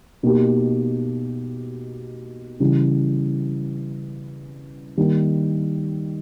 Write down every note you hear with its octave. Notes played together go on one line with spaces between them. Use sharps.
B2 A#3 D#4 G4
C#3 E3 G3
D#3 G3 A#3 D#4